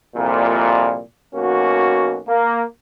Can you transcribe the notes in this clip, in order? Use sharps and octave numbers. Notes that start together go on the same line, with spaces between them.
C2 F2 A#2
B1 A#3 C#4 F#4
A#3